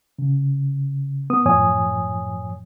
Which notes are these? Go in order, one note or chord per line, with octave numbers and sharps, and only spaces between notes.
C#3
B3 D#6
F#2 A2 F3 C#5 G#5 D#6